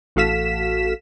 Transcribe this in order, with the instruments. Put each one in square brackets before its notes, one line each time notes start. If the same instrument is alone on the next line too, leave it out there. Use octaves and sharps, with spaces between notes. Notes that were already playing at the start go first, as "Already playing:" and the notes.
[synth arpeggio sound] A1 F#4 A4 F5 B6 E7